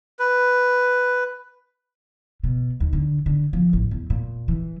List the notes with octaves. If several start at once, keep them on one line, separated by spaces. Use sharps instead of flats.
B4
B2
D#2
D3
D3
F3
A1
E2
A#2
E3